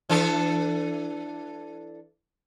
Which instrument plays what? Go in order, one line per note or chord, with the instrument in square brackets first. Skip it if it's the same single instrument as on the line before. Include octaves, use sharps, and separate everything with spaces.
[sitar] E3 D4 A4